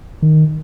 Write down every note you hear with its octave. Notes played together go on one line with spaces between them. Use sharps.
D#3